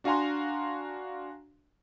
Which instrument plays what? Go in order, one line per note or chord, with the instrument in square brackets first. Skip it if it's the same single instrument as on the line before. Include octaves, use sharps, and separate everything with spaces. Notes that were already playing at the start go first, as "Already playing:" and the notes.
[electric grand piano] D4 F#4 F5 G#5 A#5 C6